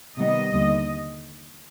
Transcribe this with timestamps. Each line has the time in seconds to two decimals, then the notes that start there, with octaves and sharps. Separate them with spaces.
0.18 C3 D#3 G3 B3 D#5
0.52 D#2 D3 G3